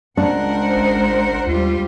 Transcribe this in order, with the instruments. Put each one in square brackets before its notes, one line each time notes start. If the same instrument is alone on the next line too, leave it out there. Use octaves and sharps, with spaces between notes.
[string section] C#2 C5 [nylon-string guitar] D4 [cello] A#4 F#5
[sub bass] G#1
[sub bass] D#2 [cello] G3 F4